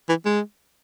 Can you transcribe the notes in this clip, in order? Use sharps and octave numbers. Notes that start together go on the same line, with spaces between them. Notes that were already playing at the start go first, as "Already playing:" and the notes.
E3
G#3